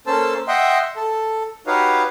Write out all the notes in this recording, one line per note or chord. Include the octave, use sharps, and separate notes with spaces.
A#3 C#4 A4 C5 A5 E6
D#5 E5 F#5 G5 C6
A4
D#4 F#4 G4 B4 C#5 F5